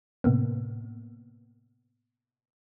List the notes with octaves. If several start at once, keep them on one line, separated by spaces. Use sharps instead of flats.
A2 C3 A#3 B3